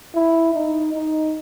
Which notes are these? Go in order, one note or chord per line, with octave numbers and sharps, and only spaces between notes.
E4
D#4
D#4